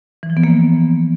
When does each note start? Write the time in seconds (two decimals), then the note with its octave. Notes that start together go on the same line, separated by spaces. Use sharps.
0.23 E3
0.30 F3
0.37 B3
0.44 A#3